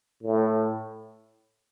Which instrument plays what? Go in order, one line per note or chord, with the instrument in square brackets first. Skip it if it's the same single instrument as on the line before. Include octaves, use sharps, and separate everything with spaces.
[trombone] A2